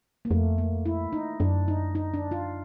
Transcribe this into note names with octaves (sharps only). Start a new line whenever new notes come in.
A#3
F2 A3
A#3
E4
D#4
F#2 D4
D#4
D#4
D4
F4